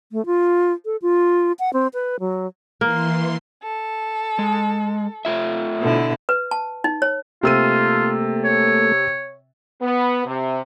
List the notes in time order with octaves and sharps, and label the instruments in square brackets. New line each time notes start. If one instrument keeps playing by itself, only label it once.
[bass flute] A3
F4
A4
F4
F#5
C4
B4
F#3
[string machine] E3 C6 [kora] A#3
[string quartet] A4
[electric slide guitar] G#3
A3 F4 E5
[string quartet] B2 D3 E4
[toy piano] B4
A5
D#4
C#5
[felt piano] C3 E6 D#7 [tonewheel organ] A3 A#3 A4 [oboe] F4
[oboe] C#5
[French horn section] B3
C3